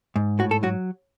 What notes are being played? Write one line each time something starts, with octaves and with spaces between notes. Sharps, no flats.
G#2
A2 F#4
A4
F#3 F#4